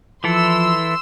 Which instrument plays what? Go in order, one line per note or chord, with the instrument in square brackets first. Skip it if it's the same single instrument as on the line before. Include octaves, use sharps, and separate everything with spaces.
[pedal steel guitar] E3 E4 A4 [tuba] F3 [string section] C6 E6